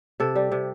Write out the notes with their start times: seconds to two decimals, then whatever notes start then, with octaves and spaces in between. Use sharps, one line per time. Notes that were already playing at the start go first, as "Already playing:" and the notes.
0.20 C3 A4
0.35 G3
0.52 C3